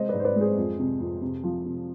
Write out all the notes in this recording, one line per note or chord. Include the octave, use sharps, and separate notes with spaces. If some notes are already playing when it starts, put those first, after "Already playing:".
Already playing: C3 G#3 C5 D#5
G#2 B4 D5
C5
B4 D5
G#3
G#4 C5
F2
C3
F2
C3
F3
C3